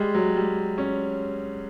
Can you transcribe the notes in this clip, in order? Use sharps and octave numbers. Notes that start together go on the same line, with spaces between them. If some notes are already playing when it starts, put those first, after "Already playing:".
Already playing: G3 G#3
F#3
G3
C#4